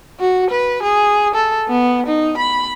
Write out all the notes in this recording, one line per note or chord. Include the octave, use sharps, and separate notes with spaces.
F#4
B4
G#4
A4
B3
D#4
B5